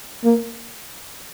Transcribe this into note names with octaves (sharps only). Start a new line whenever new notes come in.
A#3